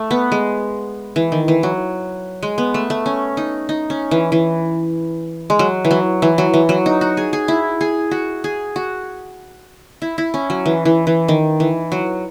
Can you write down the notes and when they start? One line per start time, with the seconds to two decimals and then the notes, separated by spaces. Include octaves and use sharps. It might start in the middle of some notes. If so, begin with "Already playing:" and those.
Already playing: A3
0.11 B3
0.32 G#3
1.16 E3
1.32 D#3
1.48 E3
1.63 F#3
2.43 G#3
2.58 B3
2.74 A3
2.90 A3
3.06 C#4
3.37 D#4
3.69 D#4
3.90 C#4
4.11 E3
4.32 E3
5.50 G#3
5.59 F#3
5.85 E3
5.91 F#3
6.22 E3
6.38 F#3
6.54 E3
6.69 F#3
6.86 D#4
7.01 F#4
7.17 G#4
7.33 G#4
7.48 E4
7.81 G#4
8.11 F#4
8.44 G#4
8.76 F#4
10.02 E4
10.18 E4
10.34 C#4
10.50 F#3
10.66 E3
10.85 E3
11.07 E3
11.28 D#3
11.60 E3
11.92 F#3